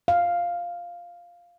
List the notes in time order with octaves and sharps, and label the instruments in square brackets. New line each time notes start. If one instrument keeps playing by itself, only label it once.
[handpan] F5